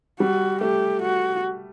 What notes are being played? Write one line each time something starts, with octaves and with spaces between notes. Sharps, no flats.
G3 F#4
A3 G4
F#4